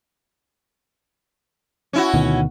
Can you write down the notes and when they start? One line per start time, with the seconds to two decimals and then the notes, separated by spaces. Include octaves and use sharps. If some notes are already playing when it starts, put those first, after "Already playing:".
1.93 C#4 E4 F#4
2.14 D2 B2 D#3